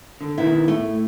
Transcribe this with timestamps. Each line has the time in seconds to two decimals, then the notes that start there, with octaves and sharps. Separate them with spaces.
0.21 D3
0.38 B2 D#3 B3 E4
0.68 A2 A3